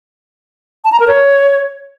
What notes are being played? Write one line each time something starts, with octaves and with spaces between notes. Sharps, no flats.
A5
A#5
A#4
C#5